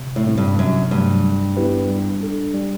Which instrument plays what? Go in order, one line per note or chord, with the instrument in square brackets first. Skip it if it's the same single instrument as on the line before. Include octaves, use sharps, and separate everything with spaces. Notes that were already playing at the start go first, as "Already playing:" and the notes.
Already playing: [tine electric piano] C3
[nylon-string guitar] A2
[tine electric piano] G3 C4 E4
[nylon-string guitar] G2
[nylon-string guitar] F#2 [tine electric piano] C3
[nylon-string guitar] G2 [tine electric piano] F#3 A3
[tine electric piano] G3
B3 E4 G4 B4
G3
D4 A4
G3